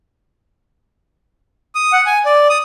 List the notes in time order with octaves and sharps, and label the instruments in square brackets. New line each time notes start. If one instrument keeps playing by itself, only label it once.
[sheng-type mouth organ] D#6
F#5
G#5
D5
D#6